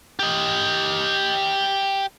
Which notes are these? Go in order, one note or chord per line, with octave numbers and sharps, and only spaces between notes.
G4 D#5